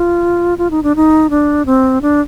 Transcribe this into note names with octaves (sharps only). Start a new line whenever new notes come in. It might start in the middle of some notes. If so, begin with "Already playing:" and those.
Already playing: F4
F4
D#4
D4
D#4
D4
C4
D4